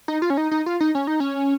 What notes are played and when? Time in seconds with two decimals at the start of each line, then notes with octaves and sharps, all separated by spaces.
0.08 D#4
0.22 F4
0.30 C#4
0.37 D#4
0.51 D#4
0.66 F4
0.80 D#4
0.95 C#4
1.07 D#4
1.20 C#4